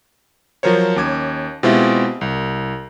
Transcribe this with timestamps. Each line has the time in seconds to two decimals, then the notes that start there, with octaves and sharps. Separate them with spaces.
0.63 F3 F#3 A#4 C5 C#5
0.96 D#2 C#4 D6 G#6
1.63 B2 G#3 C4 E4 F4 G4
2.21 C2